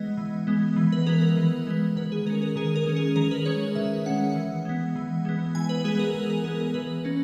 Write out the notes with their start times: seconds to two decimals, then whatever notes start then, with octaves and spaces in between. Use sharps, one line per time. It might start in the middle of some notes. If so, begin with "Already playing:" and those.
Already playing: E3 G#3 B3 D#5
0.17 E3
0.47 G#3 B3
0.76 E3
0.92 B4
1.07 G#3 B3 A#4
1.21 A#4
1.37 E3
1.67 G#3 B3
1.96 D#3 B4
2.12 G#4
2.26 G#3 C#4 A#4
2.42 A#4
2.56 D#3 G#4
2.76 A#4
2.86 G#3 C#4
2.96 G#4
3.16 D#3 A#4
3.31 B4
3.45 G#3 C#4 C#5
3.75 D#3 E5
4.06 G#3 C#4 F#5
4.36 E3
4.65 G#3 B3
4.96 E3
5.25 G#3 B3
5.55 E3 G#5
5.69 B4
5.84 G#3 B3 G#4
5.99 A#4
6.14 E3
6.30 A#4
6.44 G#3 B3 G#4
6.60 A#4
6.74 E3 B4
7.05 A#3 C#4